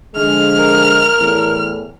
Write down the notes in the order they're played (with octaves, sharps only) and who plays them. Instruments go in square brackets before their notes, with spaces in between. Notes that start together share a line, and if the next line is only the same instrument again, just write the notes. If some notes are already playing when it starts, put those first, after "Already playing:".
[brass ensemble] D3 F3 G#3 [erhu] F6
[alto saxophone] A#4
[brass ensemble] E2 A2